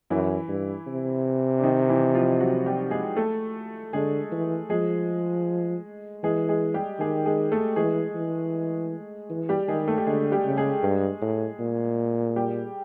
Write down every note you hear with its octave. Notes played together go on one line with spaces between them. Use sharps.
F#2 E3 E4
G2
C3
D4
D#3 D#4
E3 E4
F3 F4
F#3 F#4
G3 G4
G#3 G#4
A3 A4
D3 G#3 G#4
E3
F3 G#3 G#4
E3 G#3 G#4
G#3 G#4
G3 G4
D#3 G#3 G#4
G#3 G#4
A3 A4
E3 G#3 G#4
E3
E3
G3 G4
D#3 G#3 G#4
A3 A4
G4
D3 G#3 G#4
G3 G4
C#3
G#3 G#4
G2
A2
A#2
G3 G4